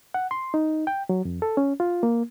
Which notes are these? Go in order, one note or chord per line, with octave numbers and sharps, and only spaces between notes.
F#5
C6
D#4
G5
F#3
F2
A4
C#4
F4
A#3